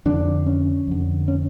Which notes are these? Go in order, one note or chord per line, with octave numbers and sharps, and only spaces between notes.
F2 D3 D4
C#4
F2 D3
C#4